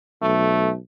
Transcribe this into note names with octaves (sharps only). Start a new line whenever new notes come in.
B1 A3